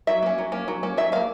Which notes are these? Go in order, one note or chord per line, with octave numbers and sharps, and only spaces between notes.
F#3 E5
A#3 C#4
F#3
A#3 C#4
F#3
A#3 C#4
F#3 E5
A#3 C#4 F5